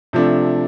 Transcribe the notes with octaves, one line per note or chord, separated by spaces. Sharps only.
C3 F3 A3 D4